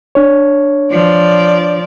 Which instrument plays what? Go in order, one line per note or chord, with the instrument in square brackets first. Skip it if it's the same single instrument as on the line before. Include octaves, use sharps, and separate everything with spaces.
[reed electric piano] D4 C#5
[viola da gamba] F3 D5